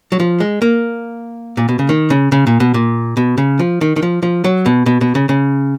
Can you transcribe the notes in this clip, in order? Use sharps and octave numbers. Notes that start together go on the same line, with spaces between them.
F#3
F3
G#3
A#3
A#2
B2
C#3
D#3
C#3
C#3
A#2
B2
A#2
B2
C#3
F3
D#3
D#3
F3
F3
F#3
B2
B2
B2
C#3
C#3